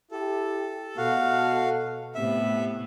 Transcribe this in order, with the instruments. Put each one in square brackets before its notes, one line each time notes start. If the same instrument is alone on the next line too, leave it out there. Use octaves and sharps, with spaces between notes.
[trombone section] E4 G4 [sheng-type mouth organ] A4
[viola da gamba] B2 [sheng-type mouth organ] F#4 F5 [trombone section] A4
[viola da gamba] A2 B3 [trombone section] C3 [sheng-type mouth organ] E5